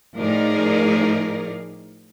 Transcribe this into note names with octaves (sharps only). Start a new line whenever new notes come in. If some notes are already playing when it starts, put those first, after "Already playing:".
A2 F3 D#4 G#4 A#4 D5